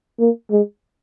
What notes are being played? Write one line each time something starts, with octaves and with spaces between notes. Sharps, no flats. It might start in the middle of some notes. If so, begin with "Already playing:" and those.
A#3
G#3